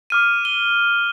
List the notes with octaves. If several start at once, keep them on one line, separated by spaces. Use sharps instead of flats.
D6 F6 D#7
D#7 G7